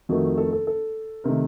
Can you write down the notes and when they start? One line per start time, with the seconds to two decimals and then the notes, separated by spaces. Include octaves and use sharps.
0.09 F2 D#3 A3 F#4
0.38 A4
0.53 A4
0.67 A4
1.24 C3 D#3 A3 A#4